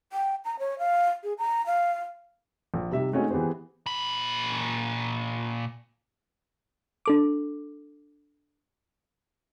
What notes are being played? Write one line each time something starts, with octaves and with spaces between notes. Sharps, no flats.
G5
A#5
C#5
F5
G#4
A#5
F5
A#1
C3 G3 D#4 E5
G#3 A3 C4 C#4 D#4 F#4
E3 B3 G4 G#4 C5
A#2 B5
D4 A4 D6